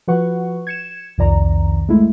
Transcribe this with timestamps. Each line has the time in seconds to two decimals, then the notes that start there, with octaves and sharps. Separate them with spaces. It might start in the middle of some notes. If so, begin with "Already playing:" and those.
0.08 F3 F#4 B4 F#5 C#6
0.67 G#6 C#7 E7
1.18 C2 F2 D#3 D5 A#5
1.89 G#3 A3 E4